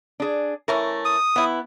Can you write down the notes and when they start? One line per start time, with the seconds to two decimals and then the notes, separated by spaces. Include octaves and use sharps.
0.20 D4 G#4
0.68 E3 A3 C#4 A#4
1.05 D#6
1.36 E3 B3 E4